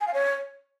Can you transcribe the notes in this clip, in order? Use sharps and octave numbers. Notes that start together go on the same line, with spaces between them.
G#5
F5
C#5